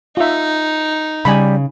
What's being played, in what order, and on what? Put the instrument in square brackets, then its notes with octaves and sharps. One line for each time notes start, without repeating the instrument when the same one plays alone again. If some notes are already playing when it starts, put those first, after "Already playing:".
[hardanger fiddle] D#4 [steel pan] F4 E5
[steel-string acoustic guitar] C#3 [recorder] G3 [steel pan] G#5 B5